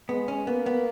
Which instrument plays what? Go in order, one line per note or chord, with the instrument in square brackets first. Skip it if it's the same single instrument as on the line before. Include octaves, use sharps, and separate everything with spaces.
[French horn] G#3 [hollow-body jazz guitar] B3
[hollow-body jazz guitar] C#4
[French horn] A#3 [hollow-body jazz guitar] B3
[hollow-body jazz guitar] B3